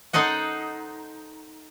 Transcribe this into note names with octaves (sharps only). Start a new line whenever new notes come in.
D#4 A4 C5 D#5 F#5